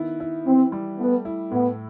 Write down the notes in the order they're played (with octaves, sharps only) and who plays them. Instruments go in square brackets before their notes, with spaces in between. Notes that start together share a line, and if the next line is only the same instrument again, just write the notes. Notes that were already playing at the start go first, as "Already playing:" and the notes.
Already playing: [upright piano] D#3 B3 E4
E4
[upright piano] E3 [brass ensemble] C4
[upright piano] G3
[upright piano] A3 [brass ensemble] B3
[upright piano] E4
[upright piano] A2 [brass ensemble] B3